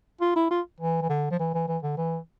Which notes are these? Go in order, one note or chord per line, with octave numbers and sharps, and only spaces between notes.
F4
E4
F4
E3
E3
D3
F3
E3
E3
E3
D3
E3